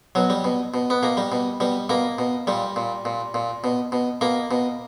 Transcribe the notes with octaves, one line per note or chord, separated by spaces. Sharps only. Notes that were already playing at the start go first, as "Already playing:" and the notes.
B2 F#3
G3
B2
B2
B3
B2 A#3
G3
B2
B2 G3
B2 A#3
B2
A#2 G3
A#2
A#2
A#2
B2
B2
B2 A#3
B2